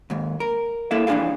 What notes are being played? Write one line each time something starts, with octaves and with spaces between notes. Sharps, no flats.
D#2 G#2
A#4
A#3 E4 A4 E5 F5
F2 E3 D4 D#4 G#4 F5